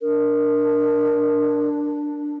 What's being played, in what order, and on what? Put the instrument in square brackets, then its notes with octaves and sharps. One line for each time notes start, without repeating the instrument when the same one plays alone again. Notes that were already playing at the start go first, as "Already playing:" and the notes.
[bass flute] D4 [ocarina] A#4